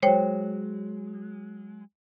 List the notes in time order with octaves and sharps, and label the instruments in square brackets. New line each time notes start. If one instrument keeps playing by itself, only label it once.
[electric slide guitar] F#3 G#3 [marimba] C5 C#5 G5